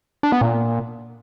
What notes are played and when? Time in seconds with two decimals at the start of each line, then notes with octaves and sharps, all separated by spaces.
0.23 D4
0.32 B3
0.41 A#2